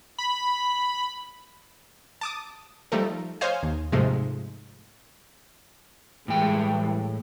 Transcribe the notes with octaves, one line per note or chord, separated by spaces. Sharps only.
B5
A5 D6 D#6
F3 G3 A3 D#4 A4 A#4
C5 C#5 D#5 F5 G#5
D#2
G#2 C3 F3 G#3 A3
A2 E3 G3 G#3 G5